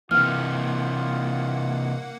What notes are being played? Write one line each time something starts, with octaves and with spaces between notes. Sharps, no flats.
C3 E3 A#3 F4 F#5 F6